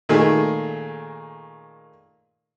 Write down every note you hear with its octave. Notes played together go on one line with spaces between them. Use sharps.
A#2 D#3 A3 G#4